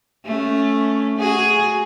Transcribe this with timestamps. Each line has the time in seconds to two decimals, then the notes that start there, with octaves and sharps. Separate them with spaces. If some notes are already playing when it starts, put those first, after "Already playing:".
0.25 A3 C#4
1.17 F#4 G#4